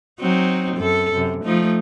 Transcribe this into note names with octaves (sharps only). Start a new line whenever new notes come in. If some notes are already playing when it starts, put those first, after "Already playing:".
F#3 C4 D#4
F#2 A4
F#2 C3
F3 A3 D#4